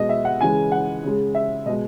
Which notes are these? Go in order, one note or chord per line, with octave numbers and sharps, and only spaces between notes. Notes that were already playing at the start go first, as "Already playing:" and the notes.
Already playing: B2 G#3 D#5
E5
F#5
C#3 E3 G#3 G#5
F#5
C#3 G#3
E5
B2 G#3 D#5